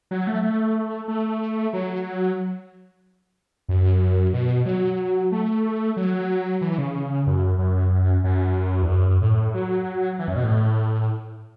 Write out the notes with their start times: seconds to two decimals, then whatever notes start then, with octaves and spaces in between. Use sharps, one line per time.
0.11 F#3
0.27 A3
0.43 A3
1.08 A3
1.73 F#3
3.68 F#2
4.33 B2
4.66 F#3
5.32 A3
5.97 F#3
6.61 E3
6.78 C#3
7.27 F#2
7.58 F#2
8.24 F#2
8.82 E2
8.89 F#2
9.21 A2
9.54 F#3
10.19 E3
10.28 F#2
10.36 B2
10.44 A2